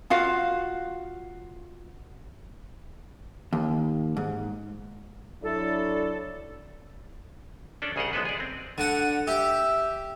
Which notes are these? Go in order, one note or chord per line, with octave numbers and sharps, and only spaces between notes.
F4 F#4 F5
D#2
G#2
F#3 D4 E4 A4
C#4 D4 A4 D5
C2 C#3 G#4 A#4 C5 F#5
B1 G#3 B3 A4 B4
G#4 D5
C4
D3 F#5
G4 E5